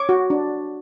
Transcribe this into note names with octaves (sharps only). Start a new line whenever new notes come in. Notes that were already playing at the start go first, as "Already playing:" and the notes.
Already playing: C#5 D6
F#4
D4